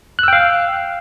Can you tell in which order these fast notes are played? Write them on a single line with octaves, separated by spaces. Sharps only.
F#6 E6 G5 F5